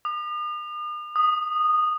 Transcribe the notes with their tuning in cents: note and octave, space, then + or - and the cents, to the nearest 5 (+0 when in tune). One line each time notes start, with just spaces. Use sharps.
D#6 -45
D#6 -15